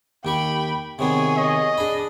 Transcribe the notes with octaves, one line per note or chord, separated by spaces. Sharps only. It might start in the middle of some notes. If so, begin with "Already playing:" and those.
D#2 G4 G5 B5 C#6
C3 D#3 B3 G#4 C#5
D#5
D4 G#4 B5